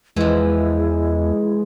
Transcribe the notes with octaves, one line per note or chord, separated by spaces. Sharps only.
E2 E3 F3 G#3 E4